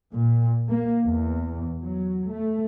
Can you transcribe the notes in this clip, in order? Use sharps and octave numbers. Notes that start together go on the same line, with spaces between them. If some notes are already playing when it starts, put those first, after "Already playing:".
A#2
A#3
E2
F#3
A3